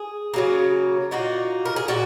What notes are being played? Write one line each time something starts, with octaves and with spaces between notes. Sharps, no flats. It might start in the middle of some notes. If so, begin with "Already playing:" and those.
Already playing: G#4
C#3 F#3 A#3
A#2 A#3 D#4 F#4
A#4
G#4
A#2 A#3 F#4